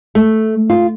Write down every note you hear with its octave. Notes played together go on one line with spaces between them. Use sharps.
A3
F4